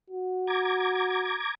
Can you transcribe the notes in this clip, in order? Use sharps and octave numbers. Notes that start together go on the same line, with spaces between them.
F#4
A#5 D6 G#6